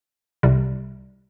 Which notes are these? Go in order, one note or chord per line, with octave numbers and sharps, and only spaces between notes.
C2 C3 G3